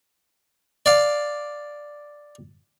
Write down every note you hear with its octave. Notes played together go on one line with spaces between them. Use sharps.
D5 F5